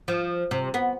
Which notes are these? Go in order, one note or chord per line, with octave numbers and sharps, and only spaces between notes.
F3
C3
B3